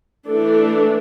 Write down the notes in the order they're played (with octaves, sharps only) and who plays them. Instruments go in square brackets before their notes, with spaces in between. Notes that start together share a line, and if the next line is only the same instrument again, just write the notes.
[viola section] E3 A3 D4 A4